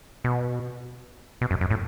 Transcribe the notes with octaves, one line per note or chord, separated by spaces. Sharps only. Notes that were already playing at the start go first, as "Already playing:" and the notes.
B2
B2
F#2
F#2
A2